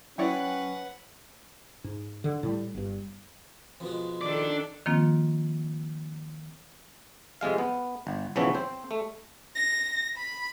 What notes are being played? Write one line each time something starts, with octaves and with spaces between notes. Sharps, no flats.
F#3 C#4 E4 B4 C#5 D5 F#5 G5
G#2
D3
A2 G3
G1 G2
F2 B2 G#3
D#3 D4 A4 D5
D#3 F3 A#3 C4 F4
F2 C3 G#3 F5
B3
G1
B1 C#3 E3 F3 B3 C#5
C4 C5
A3
A#6
B5